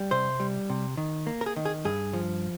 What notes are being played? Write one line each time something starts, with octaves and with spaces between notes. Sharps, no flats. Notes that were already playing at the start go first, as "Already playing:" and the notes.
Already playing: G3
C3 C5
G3
C3
D#3
A#3
A#4
G#4
D#3
G#4
G2 G#4
F3